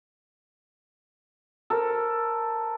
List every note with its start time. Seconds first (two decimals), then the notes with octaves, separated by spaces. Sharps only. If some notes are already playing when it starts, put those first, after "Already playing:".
1.70 A4 A#4 C5